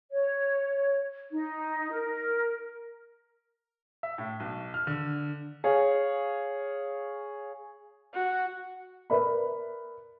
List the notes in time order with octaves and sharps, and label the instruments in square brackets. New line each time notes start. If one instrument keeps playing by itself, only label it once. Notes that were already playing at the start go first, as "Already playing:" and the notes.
[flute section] C#5
D#4
A#4
[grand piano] E5
A2
B1
F6
D3
G#4 C#5 F5
[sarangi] F#4
[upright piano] A#4 B4 D5 E5 B5